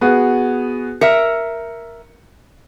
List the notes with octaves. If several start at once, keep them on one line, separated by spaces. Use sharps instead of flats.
B3 F#4 G#4
A#4 E5 C#7